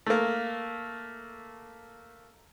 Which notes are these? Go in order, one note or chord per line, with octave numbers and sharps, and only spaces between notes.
A3 A#3